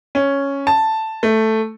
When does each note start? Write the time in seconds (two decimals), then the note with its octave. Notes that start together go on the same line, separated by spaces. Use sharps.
0.15 C#4
0.67 A5
1.23 A3